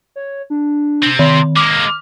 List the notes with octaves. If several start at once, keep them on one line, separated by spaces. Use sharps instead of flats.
C#5
D4
C3 C4
D#3 C6
G#3 A#3 D6 F6